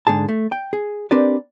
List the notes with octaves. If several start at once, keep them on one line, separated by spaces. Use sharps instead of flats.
G#2 D3 G#4 A5
A3
G5
G#4
C4 D4 G4 A#4 B4 D5